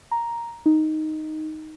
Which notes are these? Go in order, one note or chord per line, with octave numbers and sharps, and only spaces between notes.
A#5
D#4